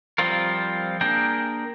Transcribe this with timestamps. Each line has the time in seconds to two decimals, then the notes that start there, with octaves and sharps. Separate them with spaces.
0.18 F3 G3 C4 F4 A#4
1.01 A#3 D4 G#4 A#4 G5